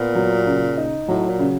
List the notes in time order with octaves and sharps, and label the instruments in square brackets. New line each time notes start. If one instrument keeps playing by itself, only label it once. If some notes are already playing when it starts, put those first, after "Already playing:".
Already playing: [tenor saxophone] A#2 [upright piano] B3
[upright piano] F#3
C#3
D#4
[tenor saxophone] A2 [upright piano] F#3
[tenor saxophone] A#2
[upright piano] C#3